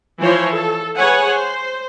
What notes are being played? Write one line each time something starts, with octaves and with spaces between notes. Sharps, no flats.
E3 F3 C5 C#5
A4
G#4 B4 C#5 F#5 G#5
C5